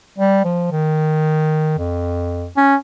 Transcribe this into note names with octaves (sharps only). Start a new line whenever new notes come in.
G3
F3
D#3
F2
C#4